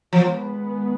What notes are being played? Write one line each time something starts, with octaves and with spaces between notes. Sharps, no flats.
D#3 F3 G#3 B3